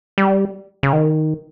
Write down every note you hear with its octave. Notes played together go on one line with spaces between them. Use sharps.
G3
C#3
D#3